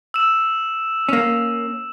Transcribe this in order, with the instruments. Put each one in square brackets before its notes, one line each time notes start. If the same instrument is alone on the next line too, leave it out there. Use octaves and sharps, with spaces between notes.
[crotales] E6 E7
[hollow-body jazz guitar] A#3 C#4